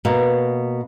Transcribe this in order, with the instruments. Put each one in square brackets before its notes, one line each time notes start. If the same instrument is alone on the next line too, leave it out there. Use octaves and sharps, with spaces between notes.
[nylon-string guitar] B2 A#3